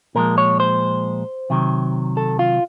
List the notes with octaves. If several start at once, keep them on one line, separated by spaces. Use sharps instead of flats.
A#2 F3 G#3 A#4
C#5
C5
C3 D#3 F#3
A4
F4